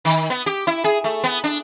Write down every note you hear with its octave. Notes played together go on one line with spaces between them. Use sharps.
D#3
B3
G4
E4
G#4
A3
B3
D4